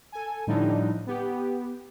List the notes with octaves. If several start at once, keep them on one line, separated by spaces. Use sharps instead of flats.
A4 G#5
A2 D3 F3 G3 D4 D#4
B3 G4